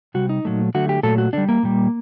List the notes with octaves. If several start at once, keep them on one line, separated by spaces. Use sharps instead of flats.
C3 G3 F#4
D#4
A#2 F#3 A3
D3 F#3 A3 F#4
G4
A#2 F#3 A3 A4
F#4
D3 G3 D4
A#3
A#2 G3